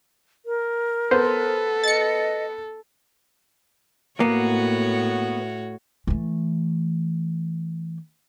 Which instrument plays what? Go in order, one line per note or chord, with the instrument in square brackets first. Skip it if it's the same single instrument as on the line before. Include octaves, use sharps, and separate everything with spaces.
[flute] A#4
[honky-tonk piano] B3 [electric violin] A4 [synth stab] C5
[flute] D#5 [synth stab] A6 C#7
[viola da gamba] A2 F#4 C#5 [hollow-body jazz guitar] A#3 B3
[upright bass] E3 A3